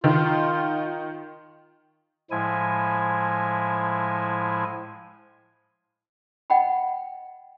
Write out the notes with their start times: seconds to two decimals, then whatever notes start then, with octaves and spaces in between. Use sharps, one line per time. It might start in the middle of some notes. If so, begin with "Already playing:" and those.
0.04 D#3 F4
2.31 A2 F3 G#3 E4 G#5
6.50 D#5 F#5 G5 B5